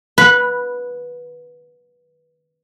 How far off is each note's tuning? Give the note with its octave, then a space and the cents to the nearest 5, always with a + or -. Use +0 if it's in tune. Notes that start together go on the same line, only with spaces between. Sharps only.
B4 -10 F#5 -40 B5 +0